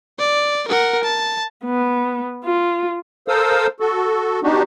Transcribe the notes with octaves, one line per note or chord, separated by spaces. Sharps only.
D5
A#4 F#5
A5
B3
F4
A4 A#4 C5 F5 D#6 E6
F#4 A4
B3 D4 D#4 F#4 G4